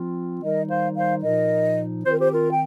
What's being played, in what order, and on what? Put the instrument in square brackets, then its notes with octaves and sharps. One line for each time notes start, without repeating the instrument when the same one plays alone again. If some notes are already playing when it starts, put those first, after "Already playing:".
Already playing: [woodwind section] F3 C4 F4
D#3 G3 D#4 A#4 D#5
C5 F5
C5 F5
A#2 F3 D#4 A#4 D#5
D#3 C4 F4 C5
A#4
G4 C5
F4 A#4
G5